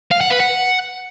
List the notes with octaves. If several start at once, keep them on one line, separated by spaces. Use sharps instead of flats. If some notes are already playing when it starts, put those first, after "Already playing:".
F5
F#5
B4
F#5